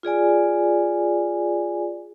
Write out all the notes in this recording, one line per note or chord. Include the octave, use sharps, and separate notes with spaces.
F4 G#4 D5 G#5